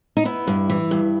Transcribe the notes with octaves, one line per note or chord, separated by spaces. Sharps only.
D#4
B3 E4
G2
E3
G2